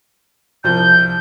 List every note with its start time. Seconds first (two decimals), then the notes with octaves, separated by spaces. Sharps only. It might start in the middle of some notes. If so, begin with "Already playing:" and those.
0.64 C2 F3 G6